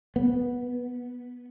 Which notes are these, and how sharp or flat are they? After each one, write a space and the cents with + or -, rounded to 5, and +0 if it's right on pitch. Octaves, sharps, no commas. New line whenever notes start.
B3 -10